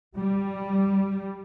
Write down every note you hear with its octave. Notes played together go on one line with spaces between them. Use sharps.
G3